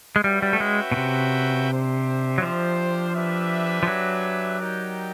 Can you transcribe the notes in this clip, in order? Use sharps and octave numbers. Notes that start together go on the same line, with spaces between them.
G#3
G3 C#4 F#4 B4 E5 G5
G3
A3
G#3
B2
C3
D4 G4 C5 E5
F#3
F3
D4 G4 B4 E5
F3
F#3
D#4 G4 A#4 D5 G5